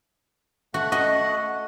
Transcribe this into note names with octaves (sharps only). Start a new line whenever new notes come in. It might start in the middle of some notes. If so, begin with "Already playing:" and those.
A3 F#4 F#5
F#4 D#5